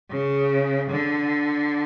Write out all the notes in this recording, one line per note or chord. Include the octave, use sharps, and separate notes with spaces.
C#3
D3